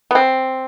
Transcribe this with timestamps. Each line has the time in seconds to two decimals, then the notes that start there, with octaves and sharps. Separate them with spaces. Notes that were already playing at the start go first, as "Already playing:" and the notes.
0.11 B3
0.15 C4